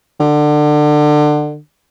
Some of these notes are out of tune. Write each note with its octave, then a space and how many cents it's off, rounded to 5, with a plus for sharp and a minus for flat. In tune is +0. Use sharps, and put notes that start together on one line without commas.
D3 +25